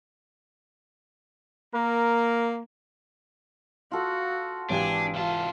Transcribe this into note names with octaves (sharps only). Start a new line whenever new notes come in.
A#3 A#4
F4 F#4 A4 F#5
G#1 E3 D4 G4 G#5
C3 F4 A5